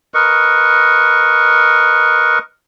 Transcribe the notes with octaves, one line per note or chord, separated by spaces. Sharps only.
A#4 B4 D#5 C#6